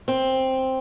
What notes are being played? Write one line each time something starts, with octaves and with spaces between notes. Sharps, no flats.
C4